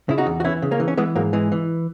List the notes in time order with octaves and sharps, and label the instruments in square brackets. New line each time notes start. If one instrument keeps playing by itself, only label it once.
[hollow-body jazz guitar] C#3 E4
D#4 F#4
E2
F#4
E3 C#4 E4
C#3
A#3 C#4
E3
C#4
E3 G#3 B3
G#2 F#3 A#3
E3 G#3
E3